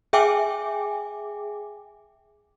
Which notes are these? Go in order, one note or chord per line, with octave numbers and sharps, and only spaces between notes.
G#4 E5 G5 G#5 D6